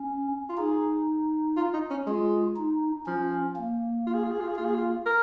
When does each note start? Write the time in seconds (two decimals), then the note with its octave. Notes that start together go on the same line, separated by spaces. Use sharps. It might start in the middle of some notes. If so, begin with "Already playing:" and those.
Already playing: C#4
0.49 F4
0.58 D#4 G#4
1.57 F4
1.74 D#4
1.91 C#4
2.06 G#3 F4
2.57 D#4
3.06 F3 C#4
3.57 A#3
4.07 F4
4.14 G#4
4.24 F4
4.31 G#4
4.41 F4
4.49 G#4
4.56 A#3 F4
4.65 G#4
4.75 F4
5.06 A#4